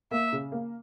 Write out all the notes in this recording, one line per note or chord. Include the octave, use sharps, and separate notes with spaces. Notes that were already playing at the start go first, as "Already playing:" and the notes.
A#3 E5
C#3
A#3